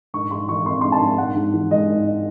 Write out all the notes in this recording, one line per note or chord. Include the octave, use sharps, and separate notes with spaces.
G#2 C#6
G#2 C6
E3 C#6
C4 C6
G#2 C6
A5
G#2
G#2 F#5
G#2
E3
G#3 D#5
G#2